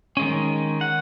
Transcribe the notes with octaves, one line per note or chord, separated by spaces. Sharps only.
D#3 G#3 C#4
F#5